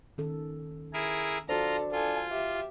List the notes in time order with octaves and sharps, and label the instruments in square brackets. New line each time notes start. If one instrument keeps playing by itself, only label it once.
[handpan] D#3 C#4 A4
[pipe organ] E4 G#4 A#4
[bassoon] D4 [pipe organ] F4 A#5 [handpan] F#4 C5 [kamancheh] A4
[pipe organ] F4 [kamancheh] A4 G#5
[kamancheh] G4 E5